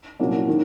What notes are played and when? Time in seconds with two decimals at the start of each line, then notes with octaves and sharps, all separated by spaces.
0.20 C2 A#2 F#3 A#3 C#4
0.49 D#3